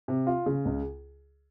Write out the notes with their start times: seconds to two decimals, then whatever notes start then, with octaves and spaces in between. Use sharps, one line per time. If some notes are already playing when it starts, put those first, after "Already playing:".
0.08 C3
0.27 F4
0.46 C#3
0.65 C#2